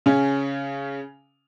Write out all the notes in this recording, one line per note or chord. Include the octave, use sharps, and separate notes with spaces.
C#3 C#4